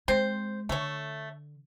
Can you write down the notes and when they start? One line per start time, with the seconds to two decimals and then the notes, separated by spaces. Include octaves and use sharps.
0.08 G#3 C4 C5
0.69 D3 A3 C#5